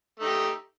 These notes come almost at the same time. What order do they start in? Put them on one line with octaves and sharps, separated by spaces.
A3 D#4 G4